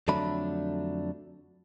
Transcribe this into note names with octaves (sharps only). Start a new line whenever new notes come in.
F2 D3 F#3 A3 D4 B5